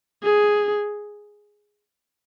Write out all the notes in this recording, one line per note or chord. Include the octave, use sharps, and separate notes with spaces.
G#4